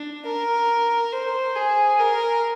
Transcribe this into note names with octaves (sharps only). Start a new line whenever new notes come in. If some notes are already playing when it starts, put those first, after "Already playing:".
Already playing: D4
A#4
C5
G#4
A#4